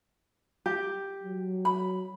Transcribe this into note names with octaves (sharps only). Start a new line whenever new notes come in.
G4
F#3
B5